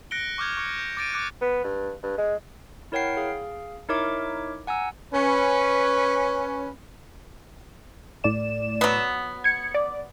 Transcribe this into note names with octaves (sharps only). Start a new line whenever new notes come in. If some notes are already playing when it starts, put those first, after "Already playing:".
F#6 A#6 C#7 D7 G7
C#6 D6 F6 G6 G#6
C#6 C#7
G6
D6 A6 D7 D#7
D6 F#6 C#7
B3
G2
G2
G#3
E4 A#4 C#5 F#5 G5 C7
G#4 F5
D#4 E4 A#4 C#5 E5 D6
F#5 G#5 A#5 E6
C#4 B4
A2 D5 E7
F#3 B3
G#6 C#7
D5